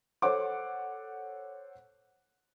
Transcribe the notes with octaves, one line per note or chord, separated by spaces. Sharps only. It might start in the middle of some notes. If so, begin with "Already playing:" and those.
A4 C5 C#5 F#5 D6